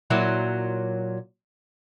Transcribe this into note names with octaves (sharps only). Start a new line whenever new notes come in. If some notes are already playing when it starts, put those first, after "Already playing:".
A#2 F#3 E4